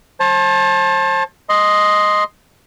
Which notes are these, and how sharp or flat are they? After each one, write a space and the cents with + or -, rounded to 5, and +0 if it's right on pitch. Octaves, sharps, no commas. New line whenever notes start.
C5 +40 A5 +0
D#5 +0 C6 +0